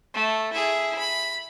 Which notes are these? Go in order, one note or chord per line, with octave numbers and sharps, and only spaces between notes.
A3
E4 G#4
B5